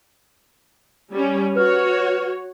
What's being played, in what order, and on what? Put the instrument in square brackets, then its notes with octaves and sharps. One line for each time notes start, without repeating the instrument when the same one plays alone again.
[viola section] G3 C#4
[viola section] F#4 C#5 [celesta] B4 F6